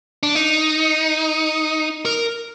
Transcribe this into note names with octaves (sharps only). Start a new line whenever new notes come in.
D4
D#4
A#4